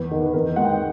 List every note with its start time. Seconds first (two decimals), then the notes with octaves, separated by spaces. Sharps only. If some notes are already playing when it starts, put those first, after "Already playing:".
Already playing: E2 B4
0.11 D#3
0.26 B4
0.34 E2 A#4
0.56 G#3 F#5
0.65 G5